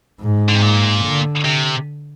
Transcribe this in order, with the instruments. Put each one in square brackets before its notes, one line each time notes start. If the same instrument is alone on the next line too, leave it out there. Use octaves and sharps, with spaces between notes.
[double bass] G#2
[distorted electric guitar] D3
C3
A#2
[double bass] D3
[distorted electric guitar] C3